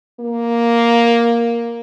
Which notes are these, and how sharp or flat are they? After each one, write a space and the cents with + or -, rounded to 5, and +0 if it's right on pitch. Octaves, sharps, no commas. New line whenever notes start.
A#3 +5